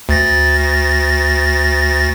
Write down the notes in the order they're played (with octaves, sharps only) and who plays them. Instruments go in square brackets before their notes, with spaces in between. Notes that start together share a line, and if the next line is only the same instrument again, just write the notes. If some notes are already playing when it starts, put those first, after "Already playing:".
[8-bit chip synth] D2 A6 A#6